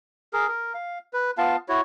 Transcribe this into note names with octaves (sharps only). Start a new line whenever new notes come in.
G#4 A#4
A#4
F5
B4
B3 F4 F5 A5
E4 F#4 C#5